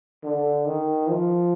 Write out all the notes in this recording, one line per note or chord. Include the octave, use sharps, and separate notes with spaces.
D3
D#3
F3